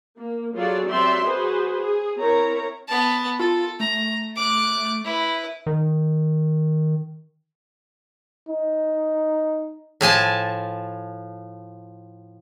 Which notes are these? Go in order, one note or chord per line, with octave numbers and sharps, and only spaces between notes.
A#3
F#3 F4 G#4 A4 C#5 D5
F#3 C4 G4 D5 E5 C6
F#4 G#4 B4 C5
G#4
C4 E4 A#4 C#5 A#5
B3 A5
F4 A4
A3 A#5
D6 F#6
E4 B4
D#3
D#4
A2 F3 G#5 A5